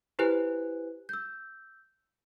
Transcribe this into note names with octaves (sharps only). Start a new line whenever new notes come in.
E4 G4 B4 C5 G#5 F#6
E6 G6